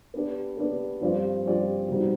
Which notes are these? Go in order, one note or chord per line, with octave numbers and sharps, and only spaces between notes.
B3 D4 G4 D5
B3 D4 G4 D5
G2 F3 C4 G4 D5
G2 F3 C4 G4 D5
B2 G3 C4 D#4 G4